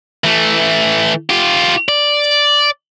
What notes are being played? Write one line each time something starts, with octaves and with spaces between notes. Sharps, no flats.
E3 A3
F4 G4
D5